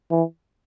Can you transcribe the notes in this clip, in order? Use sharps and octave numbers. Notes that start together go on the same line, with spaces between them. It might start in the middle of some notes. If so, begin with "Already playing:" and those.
E3